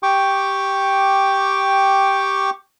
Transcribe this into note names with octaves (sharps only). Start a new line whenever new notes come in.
G4 G5 C#6 D6